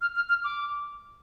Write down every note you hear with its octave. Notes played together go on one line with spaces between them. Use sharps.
F6
F6
F6
D6